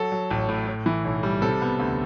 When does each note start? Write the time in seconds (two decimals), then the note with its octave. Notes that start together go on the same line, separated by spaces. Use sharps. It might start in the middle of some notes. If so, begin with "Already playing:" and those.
Already playing: F#3 A4
0.12 F#3
0.31 A1
0.49 A2
0.67 A2
0.86 E3
1.04 B1
1.23 G3
1.42 C3 A4
1.62 B3
1.80 D2